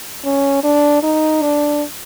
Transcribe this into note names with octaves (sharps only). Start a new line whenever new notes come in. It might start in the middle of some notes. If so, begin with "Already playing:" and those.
C#4
D4
D#4
D4